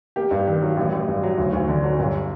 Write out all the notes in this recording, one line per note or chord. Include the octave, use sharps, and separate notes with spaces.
A#3 G4
G2
D#3
F#3
A1
A1
G2
F#3
D2
D2
D3
F#3
G1